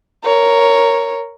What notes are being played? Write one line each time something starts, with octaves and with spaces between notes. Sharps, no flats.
A#4 C#5